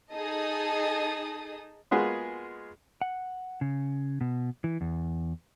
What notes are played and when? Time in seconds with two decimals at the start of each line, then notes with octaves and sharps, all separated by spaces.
0.12 D#4 G#4 A4 D#5 A5 D#6
1.91 G#3 A#3 B3 F4 F#4 G#4
3.01 F#5
3.61 C#3
4.21 B2
4.64 E3
4.81 E2